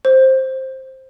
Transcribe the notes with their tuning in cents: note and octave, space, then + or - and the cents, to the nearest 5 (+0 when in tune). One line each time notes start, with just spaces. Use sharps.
C5 +10